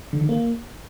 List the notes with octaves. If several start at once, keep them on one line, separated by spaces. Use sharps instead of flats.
D3
D#3
A#3